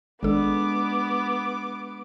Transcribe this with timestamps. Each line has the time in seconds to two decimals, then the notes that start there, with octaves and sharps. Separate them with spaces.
0.23 G#1 G#3 B3 D4 A4 D6